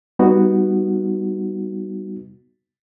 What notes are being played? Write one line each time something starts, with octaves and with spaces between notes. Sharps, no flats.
G3 B3 D#4 F#4